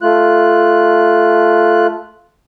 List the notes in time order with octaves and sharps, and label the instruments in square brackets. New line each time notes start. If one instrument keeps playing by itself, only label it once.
[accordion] A3 F4 F#6